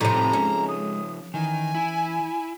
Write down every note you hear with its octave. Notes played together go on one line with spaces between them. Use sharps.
A2 C3 F3 D#4 A#5
G#3 C#4
D#6
D#3 E3 G#5
E4